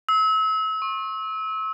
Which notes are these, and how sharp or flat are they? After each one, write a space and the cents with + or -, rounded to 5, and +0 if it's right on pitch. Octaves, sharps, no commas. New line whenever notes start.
E6 -35
C#6 -45